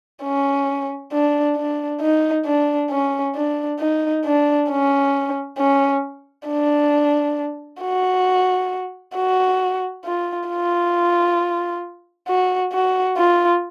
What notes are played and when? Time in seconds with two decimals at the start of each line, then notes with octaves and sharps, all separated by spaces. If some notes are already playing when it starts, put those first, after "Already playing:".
0.23 C#4
1.12 D4
1.56 D4
2.01 D#4
2.46 D4
2.91 C#4
3.35 D4
3.80 D#4
4.24 D4
4.69 C#4
5.58 C#4
6.48 D4
7.81 F#4
9.15 F#4
10.04 F4
10.49 F4
12.27 F#4
12.72 F#4
13.17 F4